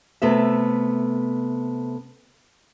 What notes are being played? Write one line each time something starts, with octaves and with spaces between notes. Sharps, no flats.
C3 A3 B3 A4 E5